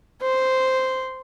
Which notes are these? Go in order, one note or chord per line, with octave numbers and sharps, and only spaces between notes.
C5